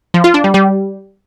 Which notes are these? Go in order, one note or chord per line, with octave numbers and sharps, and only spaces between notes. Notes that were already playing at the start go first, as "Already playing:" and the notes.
F3
F4
D4
G3
G3